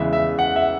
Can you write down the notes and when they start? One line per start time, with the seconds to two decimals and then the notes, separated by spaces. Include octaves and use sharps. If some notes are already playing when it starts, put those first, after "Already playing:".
Already playing: E2 C#3 E3 G#3 E5
0.13 E5
0.39 F#5
0.56 E5